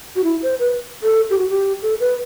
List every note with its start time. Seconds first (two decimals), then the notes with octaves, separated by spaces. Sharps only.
0.16 F#4
0.24 E4
0.42 C5
0.59 B4
1.03 A4
1.30 G4
1.38 F#4
1.49 G4
1.82 A4
2.00 B4